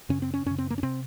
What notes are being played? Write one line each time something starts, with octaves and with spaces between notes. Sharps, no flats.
F#2 C#3 C#4
C4
C#4
F#2 C#3 C#4
C4
A#3
C#4
C3 C4